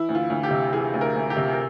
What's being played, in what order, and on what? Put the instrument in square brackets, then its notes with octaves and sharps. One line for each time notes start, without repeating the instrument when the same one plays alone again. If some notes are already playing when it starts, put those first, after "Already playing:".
Already playing: [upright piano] E3 E4
D2
F4
D2
G4
C3
E3 G#4
D2
A#4
D2
G4
C3
A#4